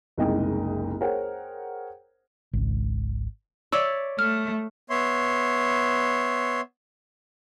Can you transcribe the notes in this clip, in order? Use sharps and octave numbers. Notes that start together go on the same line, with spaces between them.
F#1 C2 G#3 D#4 D#5 G5
G#4 A#4 C5 C#5 F#5 G5
G#1 C#2
C#5 D5 E5 E6
A3 F6
B3 C#5 E5 C6